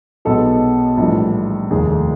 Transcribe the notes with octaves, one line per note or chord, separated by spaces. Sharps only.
B1 B2 G#3 A4
A#1 A2 E3 G3
F1 D#2 D#3 G#4
A4